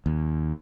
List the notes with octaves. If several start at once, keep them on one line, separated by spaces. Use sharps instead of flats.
D#2